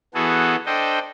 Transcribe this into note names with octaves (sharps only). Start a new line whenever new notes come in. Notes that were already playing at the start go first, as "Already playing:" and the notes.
E3 B3 F#4 G#4 A4
D4 A4 C5 D#5 G5